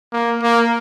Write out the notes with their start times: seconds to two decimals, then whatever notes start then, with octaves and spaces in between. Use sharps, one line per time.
0.13 A#3
0.42 A#3